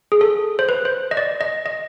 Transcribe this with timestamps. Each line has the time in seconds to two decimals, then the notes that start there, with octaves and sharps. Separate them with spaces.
0.12 G#4
0.21 A4
0.59 C5
0.69 B4
0.85 C5
1.11 D#5
1.17 D5
1.41 D#5
1.66 D#5